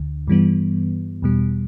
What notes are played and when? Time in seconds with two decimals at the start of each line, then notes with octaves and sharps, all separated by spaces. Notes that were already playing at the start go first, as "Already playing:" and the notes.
Already playing: D2 D3
0.28 G2 E3 G3 B3
1.22 E2 B2 G3